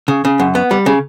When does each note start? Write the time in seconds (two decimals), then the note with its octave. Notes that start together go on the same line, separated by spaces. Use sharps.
0.08 C#3
0.25 C#3
0.39 F#2
0.55 B3
0.71 G3
0.86 C#3